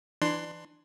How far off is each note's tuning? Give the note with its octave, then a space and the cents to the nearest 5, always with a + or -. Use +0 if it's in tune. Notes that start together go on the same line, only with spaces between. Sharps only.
E3 +20 D4 +25 C6 +0